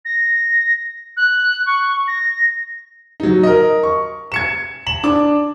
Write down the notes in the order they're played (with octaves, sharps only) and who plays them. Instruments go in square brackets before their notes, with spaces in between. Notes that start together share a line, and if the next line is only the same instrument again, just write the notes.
[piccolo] A#6
F#6
C#6
A#6
[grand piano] F#3 D#4
A#4 D#5
C#6
G#6 C#7 E7
E7 F#7
D4 D6